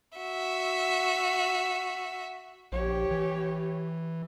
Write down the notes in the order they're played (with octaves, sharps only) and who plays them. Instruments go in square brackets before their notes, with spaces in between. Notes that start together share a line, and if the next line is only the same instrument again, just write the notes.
[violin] F#4 E5
[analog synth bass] A#1 [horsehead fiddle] G4 C#5
[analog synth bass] E3